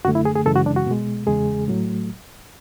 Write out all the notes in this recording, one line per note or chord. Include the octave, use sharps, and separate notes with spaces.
F#2 D3 A3 F#4
E4
G#4
G#4
F#2 C#3 E3 G#3 A4
F#4
D4
F#4
B2 G#3
E2 C#3 G#3 G#4
A2 F#3 A3